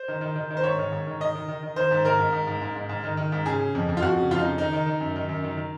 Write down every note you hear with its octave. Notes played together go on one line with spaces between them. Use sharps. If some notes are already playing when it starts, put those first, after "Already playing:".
Already playing: C5
D#3
D#3
D#3
D#3
C5
G#2 C#5
D#3
G#2
D#3
D#3 D#5
D#3
D#3
D#3
D#3 C5
G#2
D#3 A#4
G#2
G#2
G#2
G#2
G#2
G#2
D#3
D#3
G#2
C#3 G#4
C#3
F2
F2
F4
F2 F#4
C#3
F2 F4
D#4
C#3
D#3 D#4
D#3
D#3
F#2
D#3
F#2
D#3
D#3